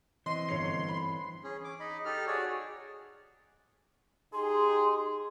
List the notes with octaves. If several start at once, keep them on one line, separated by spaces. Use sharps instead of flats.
E3 C4 D#5 C6
G1 C#5 C7
B5
C#4 G#4
D6
D#4 D#5 B5
D#4 G4 A4 F6
F#4 G#4 C#5 D5
D#4 G4 G#4 C6